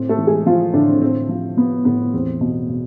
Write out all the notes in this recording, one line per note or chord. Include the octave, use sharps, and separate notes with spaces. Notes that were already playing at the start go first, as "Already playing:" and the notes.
Already playing: A2 C4
A3 A4
E3
G#3 G#4
E3 F3 F4
A2 D3 D4
C4
A2 C4
F3
F3 B3
A2 B3
E2 C4
B2
B2